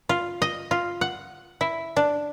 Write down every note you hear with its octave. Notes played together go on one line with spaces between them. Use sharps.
F4
D#5
F4
F#5
E4
D4